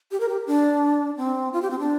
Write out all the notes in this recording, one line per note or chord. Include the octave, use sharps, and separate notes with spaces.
G4
A#4
G4
D4
C4
F4
G4
C4
D4